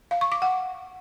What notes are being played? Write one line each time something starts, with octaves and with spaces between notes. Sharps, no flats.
F5
C#6
D6
F#5